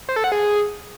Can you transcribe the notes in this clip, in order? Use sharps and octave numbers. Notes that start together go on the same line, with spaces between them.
C5
A4
F#5
G#4